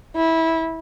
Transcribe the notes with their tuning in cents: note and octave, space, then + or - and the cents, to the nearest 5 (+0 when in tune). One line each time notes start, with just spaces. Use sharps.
E4 -15